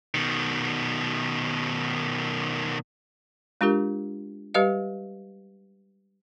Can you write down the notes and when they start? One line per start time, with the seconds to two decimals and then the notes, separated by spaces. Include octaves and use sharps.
0.14 B2 D#3
3.61 G#3 D4 F4 G4 A#4
4.54 G3 G4 B4 D#5 F5